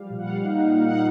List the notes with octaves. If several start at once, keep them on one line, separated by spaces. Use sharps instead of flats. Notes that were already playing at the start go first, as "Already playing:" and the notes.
Already playing: F3 G3 F5
A#2
F#5
G3 F5
D#4
D#4
A#2
D#4 F#5